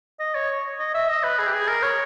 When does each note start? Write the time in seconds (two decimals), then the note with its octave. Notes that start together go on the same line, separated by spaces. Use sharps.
0.20 D#5
0.35 C#5
0.79 D#5
0.94 E5
1.09 D#5
1.24 B4
1.39 G#4
1.47 G4
1.53 G#4
1.68 A#4
1.83 C#5